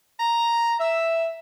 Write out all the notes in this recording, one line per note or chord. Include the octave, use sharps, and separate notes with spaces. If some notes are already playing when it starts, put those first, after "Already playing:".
A#5
E5